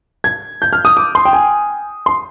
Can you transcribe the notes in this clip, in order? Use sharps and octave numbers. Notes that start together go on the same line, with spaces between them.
G#6
G6
F6
D#6
D6
C6
G5
G#5
C6